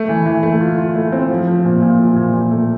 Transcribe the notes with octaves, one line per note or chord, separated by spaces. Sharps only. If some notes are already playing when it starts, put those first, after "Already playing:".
Already playing: A3
E3
E3
A3
F4
F4
A3
C4
F3
F3
A#2
A#2
F3
A#2
A#2
A3